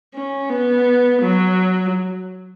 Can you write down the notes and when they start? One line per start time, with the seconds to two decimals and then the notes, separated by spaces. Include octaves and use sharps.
0.14 C#4
0.49 B3
1.23 F#3